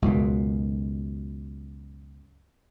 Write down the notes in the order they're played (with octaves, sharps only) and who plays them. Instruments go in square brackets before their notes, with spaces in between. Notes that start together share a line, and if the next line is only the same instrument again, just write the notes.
[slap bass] C#2 F#2 B2